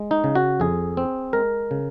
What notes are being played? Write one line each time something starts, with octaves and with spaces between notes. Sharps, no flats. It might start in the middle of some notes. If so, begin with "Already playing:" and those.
Already playing: G#3
D#4
C#3
F#4
F2 G#4
C4
G#3 A#4
C#3